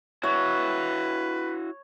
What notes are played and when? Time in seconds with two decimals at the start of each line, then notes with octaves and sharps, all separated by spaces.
0.23 E4 F#4 B4 C#5